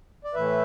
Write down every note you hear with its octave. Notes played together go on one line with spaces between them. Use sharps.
D5
A2 E3 A3 B4 E5